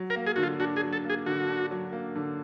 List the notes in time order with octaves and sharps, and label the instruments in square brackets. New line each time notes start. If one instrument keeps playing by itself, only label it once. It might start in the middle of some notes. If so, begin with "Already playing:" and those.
Already playing: [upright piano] F#3
[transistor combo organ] A#4
[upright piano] A#3
[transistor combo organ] G#4
[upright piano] D3 [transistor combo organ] F#4
[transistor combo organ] F4
[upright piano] D4 [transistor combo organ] F#4
[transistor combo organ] G#4
[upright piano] F#3
[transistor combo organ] A4
[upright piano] A#3 [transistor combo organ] G#4
[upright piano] D3 [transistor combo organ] F#4
[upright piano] D4
F#3
A#3
D3